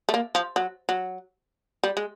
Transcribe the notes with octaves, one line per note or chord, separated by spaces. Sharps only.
A3
A#3
F3
F#3
F#3
G3
G#3